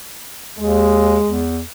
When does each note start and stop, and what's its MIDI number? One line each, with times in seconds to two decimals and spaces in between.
0.59 1.18 39
0.59 1.43 56
1.26 1.61 40